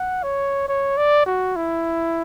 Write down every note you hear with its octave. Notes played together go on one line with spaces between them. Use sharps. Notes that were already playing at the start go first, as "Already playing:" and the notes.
Already playing: F#5
C#5
C#5
D5
F#4
E4